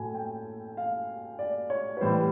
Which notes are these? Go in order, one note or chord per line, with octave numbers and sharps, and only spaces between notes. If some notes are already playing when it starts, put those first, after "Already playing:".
Already playing: A2 F#3 A3 G#5
G5
F5
D5
C#5
B4
A2 E3 G3 B3 C5